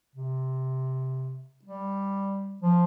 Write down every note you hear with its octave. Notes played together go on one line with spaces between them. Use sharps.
C3
G3
F3